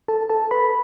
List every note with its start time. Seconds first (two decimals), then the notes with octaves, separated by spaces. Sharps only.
0.08 A4 A5
0.29 A4 A5
0.51 B4 B5